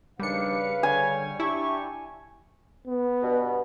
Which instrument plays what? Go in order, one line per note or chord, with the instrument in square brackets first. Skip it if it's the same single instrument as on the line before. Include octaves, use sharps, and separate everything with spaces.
[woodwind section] D#2 F3 D4 [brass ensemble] C#3 B4 F5 [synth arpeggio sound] G3 C#7
[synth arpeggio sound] D3 [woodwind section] G3 C#5 [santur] G#5
[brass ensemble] D4 G4 [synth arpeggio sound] E4 [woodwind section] A5 C#6
[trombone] B3
[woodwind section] G2 B2